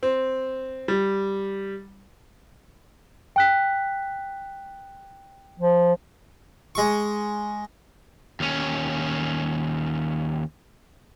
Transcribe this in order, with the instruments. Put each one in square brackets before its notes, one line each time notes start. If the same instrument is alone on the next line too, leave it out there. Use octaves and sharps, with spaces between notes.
[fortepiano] C4
G3
[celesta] G5 F#6 B6
[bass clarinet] F3
[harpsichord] G#3 C#6
[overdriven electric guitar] D#2 C#4